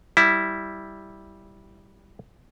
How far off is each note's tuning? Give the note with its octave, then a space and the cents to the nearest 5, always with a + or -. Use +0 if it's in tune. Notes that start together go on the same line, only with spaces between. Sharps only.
G3 +0 E4 -5